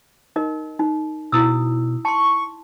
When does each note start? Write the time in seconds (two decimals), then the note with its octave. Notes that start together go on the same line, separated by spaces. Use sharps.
0.36 D#4 A#4 D#5
0.79 D#4
1.32 B2 E4 D#6 E6
2.05 A5 C6 C#6